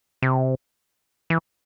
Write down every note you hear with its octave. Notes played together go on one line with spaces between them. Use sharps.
C3
E3